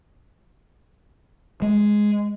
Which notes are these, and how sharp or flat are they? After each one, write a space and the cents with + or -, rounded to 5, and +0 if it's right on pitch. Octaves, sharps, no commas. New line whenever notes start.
G#3 +5